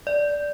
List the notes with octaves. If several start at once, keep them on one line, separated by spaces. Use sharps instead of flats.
D5